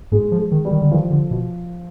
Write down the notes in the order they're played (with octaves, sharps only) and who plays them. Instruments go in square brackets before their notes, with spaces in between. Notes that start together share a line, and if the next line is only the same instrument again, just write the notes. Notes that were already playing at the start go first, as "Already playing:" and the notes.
[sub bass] G#2 [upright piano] G#3
[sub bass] F3
[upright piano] G#3
[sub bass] D#3
[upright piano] G3
[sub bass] D#3
D3
[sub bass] D#3 [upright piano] F3
[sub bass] D3
B2